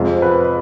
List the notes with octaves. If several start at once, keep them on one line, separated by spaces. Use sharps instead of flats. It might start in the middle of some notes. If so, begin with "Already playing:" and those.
Already playing: F2 C3 G#3
B4